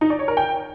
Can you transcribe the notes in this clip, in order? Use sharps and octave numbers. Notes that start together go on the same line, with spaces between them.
D#4
D5
C#5
A#4
G5